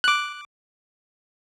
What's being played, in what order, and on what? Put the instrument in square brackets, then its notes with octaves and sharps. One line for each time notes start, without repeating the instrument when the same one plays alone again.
[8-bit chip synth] D6 F#6